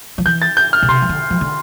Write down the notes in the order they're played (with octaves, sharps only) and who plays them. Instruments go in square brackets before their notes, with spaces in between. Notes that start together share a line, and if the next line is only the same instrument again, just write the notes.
[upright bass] F3
[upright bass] E3 [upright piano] G6
[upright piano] A6
G6
F6
[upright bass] B2
[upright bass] C3 [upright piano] C6
[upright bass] E3
D3
F3
D3